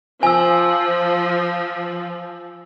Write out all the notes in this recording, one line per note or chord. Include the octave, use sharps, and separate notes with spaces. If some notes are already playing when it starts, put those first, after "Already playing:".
F3 G#5 E6